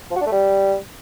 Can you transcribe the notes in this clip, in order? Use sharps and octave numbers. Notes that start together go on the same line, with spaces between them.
F3
F#4
D4
A3
G3